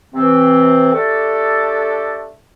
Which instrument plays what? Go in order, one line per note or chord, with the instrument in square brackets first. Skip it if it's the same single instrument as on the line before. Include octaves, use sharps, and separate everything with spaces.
[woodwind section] C3 E3 C4
A3 D4 G4 A4